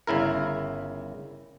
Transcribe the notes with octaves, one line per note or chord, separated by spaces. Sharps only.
G1 C#3 E4 A#4